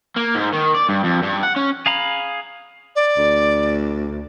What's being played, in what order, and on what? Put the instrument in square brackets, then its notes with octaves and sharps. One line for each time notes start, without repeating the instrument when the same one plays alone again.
[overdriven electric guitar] A#3
G#2
D#3
D5
G2
F2
G2
F#5
C#4
[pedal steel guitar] G#4 F5 A#5 B5
[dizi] D5
[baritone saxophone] D2